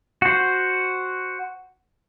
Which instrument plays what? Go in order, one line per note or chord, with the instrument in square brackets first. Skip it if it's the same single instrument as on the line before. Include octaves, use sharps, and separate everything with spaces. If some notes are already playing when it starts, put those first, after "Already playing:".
[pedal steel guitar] F#4 C5